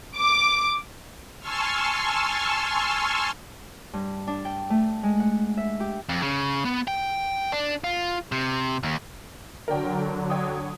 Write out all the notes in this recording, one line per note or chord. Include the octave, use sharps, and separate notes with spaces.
D6
G#5 A5 C6 C#6 E6 F6
G2
D4
G5
A3
G#3
F#5
E5
G4
F2
C#3
B3
G5
D4
F4
C3
D#2
D3 F#3 A#4 D5 G5
C#5 G5 D#6